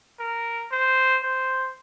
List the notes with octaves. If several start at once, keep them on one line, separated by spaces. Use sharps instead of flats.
A#4
C5
C5